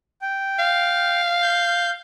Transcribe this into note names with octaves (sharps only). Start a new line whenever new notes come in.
G5
F5
G6